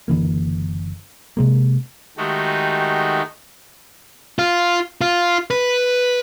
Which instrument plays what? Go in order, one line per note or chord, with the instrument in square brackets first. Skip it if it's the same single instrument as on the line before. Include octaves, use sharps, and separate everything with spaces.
[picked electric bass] F#1 D3 E3 A#3
C3 G#3 A#3
[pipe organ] D#3 G#3 A3 D#4 F#4 G4
[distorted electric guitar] F4
F4
B4